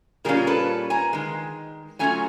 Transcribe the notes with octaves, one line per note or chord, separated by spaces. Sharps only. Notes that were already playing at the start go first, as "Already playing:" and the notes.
A#2 G3 A#3 C#4 F4 G#4 A#4
A4 B4
G#5 A#5
D#3 G#3
F#3 A3 C#4 F4 G#5 A#5